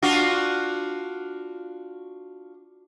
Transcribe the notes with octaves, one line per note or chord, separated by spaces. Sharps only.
D4 F4 F#4